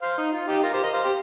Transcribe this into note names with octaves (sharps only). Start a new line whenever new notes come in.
C5 F5
D#4
F4
D#4 G4
F4 A#4
G4 C5
A#4 D#5
C5 F5
G4 C5